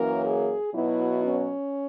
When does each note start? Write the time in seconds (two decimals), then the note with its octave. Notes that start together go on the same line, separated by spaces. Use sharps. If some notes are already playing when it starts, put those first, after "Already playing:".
Already playing: F#2 E3 A#3 C#4 A#4
0.24 G#4
0.73 B2 F#3 B3 E4
1.22 C#4